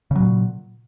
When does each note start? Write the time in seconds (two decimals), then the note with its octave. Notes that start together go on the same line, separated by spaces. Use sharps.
0.11 C#3
0.16 F#3
0.20 A#2